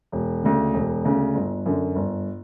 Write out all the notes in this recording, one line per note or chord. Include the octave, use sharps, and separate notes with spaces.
E1
D2 C#3
E1
D2 C#3
G1
F#2 D3
G1